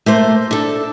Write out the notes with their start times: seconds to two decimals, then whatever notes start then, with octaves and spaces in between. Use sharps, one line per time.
0.06 A3 A#3 C5
0.51 D4 A4